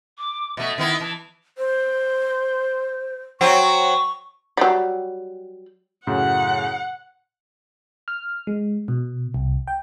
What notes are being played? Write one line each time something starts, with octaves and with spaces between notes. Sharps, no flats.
D6
B2 A3 E5
D#3 B3 E4
E3 A5
C5
F#3 C4 C#6
F#3 G3
F#2 A2 C#3 F#5
F6
G#3
B2
C2
G5